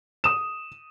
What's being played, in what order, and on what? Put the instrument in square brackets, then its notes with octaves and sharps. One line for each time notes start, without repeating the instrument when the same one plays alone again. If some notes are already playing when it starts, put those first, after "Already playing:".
[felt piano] D#6 E7